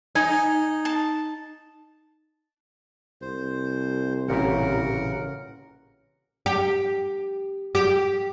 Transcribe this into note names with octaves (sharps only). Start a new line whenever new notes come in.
D#4 G#5
A5
C2 C5
A1 A#2 C#3 G4 A#4 F#5
G4
G4